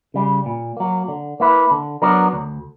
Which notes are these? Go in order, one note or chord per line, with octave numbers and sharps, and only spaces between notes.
C#3 G3
A#2
F#3 A#3
D3
A#3 E4 B4
D3
F#3 B3 D4 A#4
D2